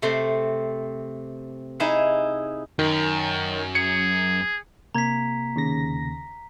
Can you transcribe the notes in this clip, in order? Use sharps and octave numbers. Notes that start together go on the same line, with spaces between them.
C3 A3 C4 C6
D#4 E4 G#4 E5 F#5
F#2 D#3
G#4 C#7
C3 A#3 A#5 G#6 B6
D#2 C#3 A#6